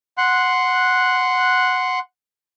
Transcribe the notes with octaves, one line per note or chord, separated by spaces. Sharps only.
F#5 C6 F#6